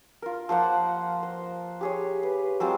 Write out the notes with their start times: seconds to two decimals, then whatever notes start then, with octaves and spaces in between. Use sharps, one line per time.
0.22 F4 A#4
0.49 F3 A#3 C5 F#5
1.23 C5
1.81 G4 G#4 C#5
2.23 B4
2.60 F#3 G#3 C4 F4